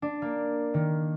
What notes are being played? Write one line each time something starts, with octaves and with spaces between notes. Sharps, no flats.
D4
A#3
D#3